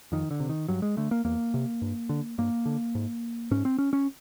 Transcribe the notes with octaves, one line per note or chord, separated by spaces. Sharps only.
F2 D#3
D3
C3
D#3
G2 F#3
G#3
D3 A3
A#3
E2 A#3
C3
G2
D3
G2 A#3
D3
G#2
G#2 C#4
C4
C#4
C#4